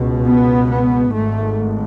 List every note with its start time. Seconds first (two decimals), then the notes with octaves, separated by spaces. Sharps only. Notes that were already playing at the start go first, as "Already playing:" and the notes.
Already playing: C#2 B2
0.27 B3
0.70 B3
1.13 G#1 G#2 A3